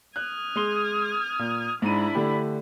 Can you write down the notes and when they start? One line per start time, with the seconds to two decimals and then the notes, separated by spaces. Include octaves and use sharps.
0.16 D#6 F6 F#6 G#6
0.56 G#3 C6 G7
1.39 A#2
1.82 G#2 D4 E4 B5 D#7
2.15 D3 A3 G4